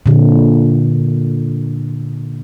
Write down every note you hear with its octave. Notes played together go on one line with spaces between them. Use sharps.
A#2 D3